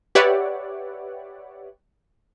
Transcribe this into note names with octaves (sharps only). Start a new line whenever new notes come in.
G4 B4 C#5 D5 E5 F#5